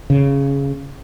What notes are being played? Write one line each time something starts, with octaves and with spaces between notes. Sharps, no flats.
C#3